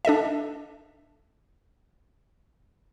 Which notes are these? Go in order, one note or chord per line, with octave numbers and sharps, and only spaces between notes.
D4 A4 D#5 E5